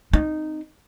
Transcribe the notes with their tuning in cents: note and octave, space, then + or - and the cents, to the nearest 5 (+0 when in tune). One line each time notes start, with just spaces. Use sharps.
C4 -10 D#4 -10